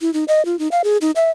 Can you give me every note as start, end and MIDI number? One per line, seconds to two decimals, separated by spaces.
0.01 0.13 64
0.14 0.24 63
0.28 0.45 75
0.45 0.58 65
0.59 0.68 63
0.72 0.82 77
0.84 0.97 68
1.01 1.11 63
1.16 1.31 76